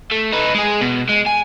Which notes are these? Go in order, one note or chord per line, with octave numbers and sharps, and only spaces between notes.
A3
D#4 B4
G#3 G#4
B2
G#3
G#5